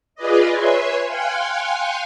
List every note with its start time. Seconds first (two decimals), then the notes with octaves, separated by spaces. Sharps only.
0.15 F4 G#4 B4 D5 D#5
0.51 B4 C#5 E5 G#5 C6
1.06 F5 G5 G#5 C6 F#6 C#7